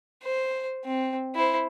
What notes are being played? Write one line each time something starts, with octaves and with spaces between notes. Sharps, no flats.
C5
C4
E4 C5